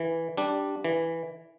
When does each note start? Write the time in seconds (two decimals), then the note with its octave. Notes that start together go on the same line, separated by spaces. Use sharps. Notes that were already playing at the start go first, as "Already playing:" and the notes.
Already playing: E3
0.37 G3 D4
0.84 E3